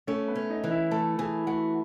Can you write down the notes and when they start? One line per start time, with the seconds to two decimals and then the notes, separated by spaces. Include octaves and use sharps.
0.07 A3 C#4 C#5
0.28 B3 B4
0.35 C#4
0.50 D#4 D#5
0.64 E3
0.71 E4 E5
0.91 A3 A4 A5
1.19 E3 G#4 G#5
1.47 A3 F#4 F#5